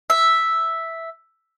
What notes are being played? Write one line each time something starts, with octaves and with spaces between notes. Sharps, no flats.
E5